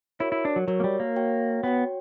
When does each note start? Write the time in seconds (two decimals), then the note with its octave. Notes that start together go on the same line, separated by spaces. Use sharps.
0.20 E4 F#4 A#4 C#5
0.32 E4
0.45 D4
0.56 F#3
0.68 F#3 F#4 A#4 C#5
0.80 A#3
0.84 G3
1.00 A#3
1.16 F#4 C#5 G5
1.64 B3 F#4 C#5 G5